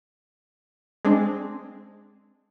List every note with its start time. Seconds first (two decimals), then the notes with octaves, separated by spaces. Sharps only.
1.05 G#3 C4 D4